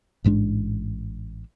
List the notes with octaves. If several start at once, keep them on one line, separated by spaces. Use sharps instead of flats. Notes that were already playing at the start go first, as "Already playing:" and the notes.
A1 G#2 G#3 D4